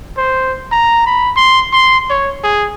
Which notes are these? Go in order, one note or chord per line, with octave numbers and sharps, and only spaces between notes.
C5
A#5
B5
C6
C6
C#5
G#4